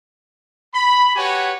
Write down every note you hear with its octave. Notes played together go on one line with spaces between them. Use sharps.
B5
F#4 G4 B4 C#5 F#5 G#5